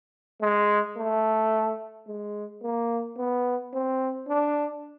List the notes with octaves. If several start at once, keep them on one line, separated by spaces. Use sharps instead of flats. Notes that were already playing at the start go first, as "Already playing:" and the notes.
G#3
A3
G#3
A#3
B3
C4
D4